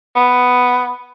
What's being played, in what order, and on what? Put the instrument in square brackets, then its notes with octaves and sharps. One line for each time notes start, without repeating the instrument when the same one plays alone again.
[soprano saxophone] B3